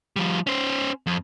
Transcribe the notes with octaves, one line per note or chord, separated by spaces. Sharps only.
F3 G3
C#4 C5
F2